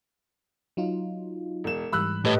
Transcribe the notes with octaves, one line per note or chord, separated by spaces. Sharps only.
F#3 D#4 F4
E1 E7
G#2 E3 G3 B5 E6 F#6
A2 G4 B4 D#5